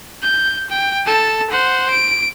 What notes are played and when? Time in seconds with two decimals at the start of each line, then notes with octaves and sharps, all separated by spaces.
0.22 G6
0.70 G5
1.06 A4 A5
1.50 C5 F#5
1.90 D7